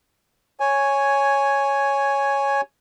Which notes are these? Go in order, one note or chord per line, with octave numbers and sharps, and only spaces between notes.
C#5 G#5